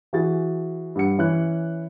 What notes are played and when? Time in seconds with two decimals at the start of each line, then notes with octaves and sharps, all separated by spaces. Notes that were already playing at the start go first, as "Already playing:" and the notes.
0.13 E3 F#4 G#4 A6
0.95 G2 F#5 C#7
1.19 E3 C#4 C#5 F#6